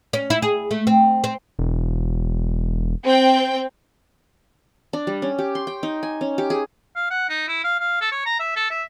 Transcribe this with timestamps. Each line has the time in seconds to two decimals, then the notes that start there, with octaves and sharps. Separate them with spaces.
0.13 C#4
0.30 E4
0.42 G#4
0.71 A3
0.87 C4
1.24 C4
1.59 E1
3.04 C4 G5
4.93 D4
5.07 G3
5.22 C#4
5.39 G4
5.55 C6
5.67 G5
5.83 D#4
6.03 G#5
6.21 C#4
6.38 G4
6.50 G#4
6.96 F5
7.11 F#5
7.29 D#4
7.48 E4
7.64 F5
7.80 F5
8.01 A4
8.12 C#5
8.26 A#5
8.40 E5
8.56 A4
8.70 E5